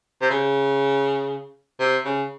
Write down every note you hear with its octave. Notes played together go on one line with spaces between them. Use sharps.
C3
C#3
C3
C#3